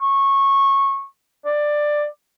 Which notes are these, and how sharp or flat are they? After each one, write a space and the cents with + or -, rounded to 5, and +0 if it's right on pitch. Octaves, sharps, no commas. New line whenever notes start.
C#6 -15
D5 +10